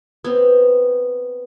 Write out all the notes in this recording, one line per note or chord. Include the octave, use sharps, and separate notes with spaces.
B3 C4